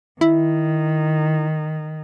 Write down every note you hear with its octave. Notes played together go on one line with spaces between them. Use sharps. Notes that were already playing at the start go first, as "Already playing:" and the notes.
D#3 E4